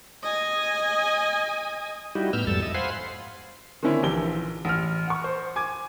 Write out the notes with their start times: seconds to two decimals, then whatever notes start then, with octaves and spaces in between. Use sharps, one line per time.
0.23 D#5 G#5
2.15 G3 D#4 E4 F#4 G4
2.33 A2 B3 E6 F6 G6
2.47 F2 G#2 G3 A4 A5 E6
2.62 D#5 E5
2.74 C5 F5 F#5 G#5 B5 C6
3.83 D3 D#3 A#3 C4 C#4 E4
4.03 A#1 E3 G4 G7
4.65 A1 F6
5.08 F#5 C#6
5.24 C5
5.56 G#5 D6 G#6